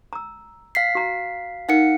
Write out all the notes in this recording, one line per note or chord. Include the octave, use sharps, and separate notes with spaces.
A#5 E6
F5 B6 C7
F#4 A#5
D#4 A#4 F5 F#5 C#7